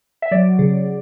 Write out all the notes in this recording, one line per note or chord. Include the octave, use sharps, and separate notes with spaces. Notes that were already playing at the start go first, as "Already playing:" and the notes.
E5
F#3 D5
C#3